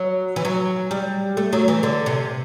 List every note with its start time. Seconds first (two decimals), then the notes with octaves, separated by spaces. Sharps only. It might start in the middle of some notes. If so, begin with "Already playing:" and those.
Already playing: F#3
0.36 E3
0.45 F#3
0.91 G3
1.37 A3
1.53 F#3
1.68 E3
1.83 D3
2.06 C3